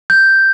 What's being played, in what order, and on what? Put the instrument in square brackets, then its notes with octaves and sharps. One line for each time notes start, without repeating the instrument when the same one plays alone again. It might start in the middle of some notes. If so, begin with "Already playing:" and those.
[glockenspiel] G6